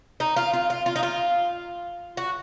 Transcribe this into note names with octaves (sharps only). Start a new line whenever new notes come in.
D#4
F4
F4
F4
F4
D#4
F4
F#4